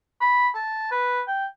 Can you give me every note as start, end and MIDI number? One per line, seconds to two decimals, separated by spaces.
0.21 0.48 83
0.55 0.91 81
0.91 1.21 71
1.27 1.45 79